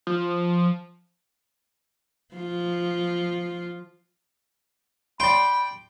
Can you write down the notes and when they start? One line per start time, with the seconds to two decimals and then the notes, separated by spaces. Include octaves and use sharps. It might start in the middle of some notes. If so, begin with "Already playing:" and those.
0.07 F3
2.35 F3 F4
5.20 D5 G5 B5 C6